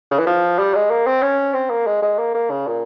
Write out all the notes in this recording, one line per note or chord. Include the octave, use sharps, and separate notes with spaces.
C#3
E3
F3
G3
G#3
A#3
C4
C#4
C4
A#3
G#3
G#3
A#3
A#3
C#3
A#2